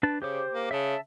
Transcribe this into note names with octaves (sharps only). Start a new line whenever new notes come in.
D4 B4 A5
C#3 G4 C5 D6
A#3
C#3 E5 A5